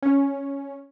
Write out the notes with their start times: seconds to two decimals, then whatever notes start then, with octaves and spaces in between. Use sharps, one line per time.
0.02 C#4